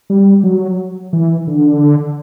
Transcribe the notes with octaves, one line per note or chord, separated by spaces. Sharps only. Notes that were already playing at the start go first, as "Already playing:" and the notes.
G3
F#3
E3
D3